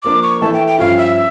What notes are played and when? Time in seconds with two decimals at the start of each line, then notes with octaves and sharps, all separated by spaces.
0.03 F3 A#3 D4 D6
0.23 C#6
0.41 E3 A3 E4 A5
0.53 G5
0.67 G5
0.79 G2 F3 C#4 F4 F5
0.98 E5